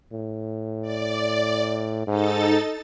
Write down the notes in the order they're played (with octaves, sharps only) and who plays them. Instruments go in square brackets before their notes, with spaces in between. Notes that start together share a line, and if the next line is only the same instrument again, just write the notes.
[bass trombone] A2
[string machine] D5
[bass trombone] G#2 [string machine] D#4 A4 A6